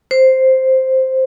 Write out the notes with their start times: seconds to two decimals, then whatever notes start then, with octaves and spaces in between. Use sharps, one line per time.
0.11 C5